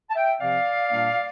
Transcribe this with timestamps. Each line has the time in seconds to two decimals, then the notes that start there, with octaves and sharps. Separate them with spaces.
0.10 A5
0.15 E5 G5
0.40 C3 F3 C4 D5 F5
0.91 A#2 G3 A#3 D4